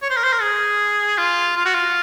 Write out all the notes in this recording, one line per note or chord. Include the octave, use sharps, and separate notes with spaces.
C#5
C5
A#4
C5
A#4
G#4
F4
F4
F#4
F4